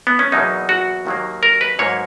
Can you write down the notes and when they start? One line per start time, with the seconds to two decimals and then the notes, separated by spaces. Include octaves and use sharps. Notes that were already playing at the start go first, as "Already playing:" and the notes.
0.07 B3
0.19 C#4
0.32 E2 B2 F#3 A#3 D#4
0.69 F#4
1.06 D#2 D#3 F#3 A#3
1.43 A#4
1.61 B4
1.79 G#2 F#3 A#3 C#5